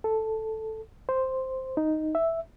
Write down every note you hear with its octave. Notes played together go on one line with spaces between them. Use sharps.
A4
C5
D#4
E5